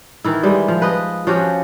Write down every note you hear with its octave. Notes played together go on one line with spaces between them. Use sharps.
D#3 E3 E4
G3 G#3
F3
B4 D#5
F3 C#4 F#4 G4